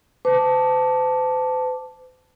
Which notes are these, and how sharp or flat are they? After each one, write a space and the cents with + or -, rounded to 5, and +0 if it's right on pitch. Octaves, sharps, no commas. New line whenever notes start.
C5 -45 A5 +0 D6 +0